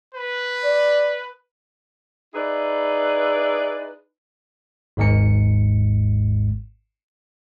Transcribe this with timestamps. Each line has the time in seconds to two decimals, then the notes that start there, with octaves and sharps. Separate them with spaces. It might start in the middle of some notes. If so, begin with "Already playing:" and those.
0.15 B4
0.64 D5
2.34 D#4 E4 G#4 B4 D5
4.97 G#1 D#2 G#2 G#3 C#7